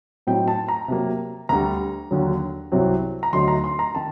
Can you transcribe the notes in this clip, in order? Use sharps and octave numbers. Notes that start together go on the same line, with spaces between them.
A2 F#3 C4 D#4 G5
A5
A#5
C3 F#3 A#3
D2 D3 G3 A#5
D#2 D3 F#3
C2 C3 F#3 C4
A#5
D2 D3 F#3 A3 D#4 C6
A#5
C6
A#5
D#3 A5